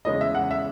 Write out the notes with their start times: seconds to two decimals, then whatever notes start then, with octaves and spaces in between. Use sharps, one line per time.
0.05 E2 C#3 G#3 C#4 E4 D#5
0.21 E5
0.35 F#5
0.51 E5